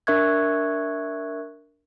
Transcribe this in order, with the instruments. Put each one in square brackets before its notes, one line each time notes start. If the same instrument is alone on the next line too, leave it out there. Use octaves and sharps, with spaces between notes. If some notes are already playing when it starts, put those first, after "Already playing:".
[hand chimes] D4 A#4 E5 C#6 F#6 G#6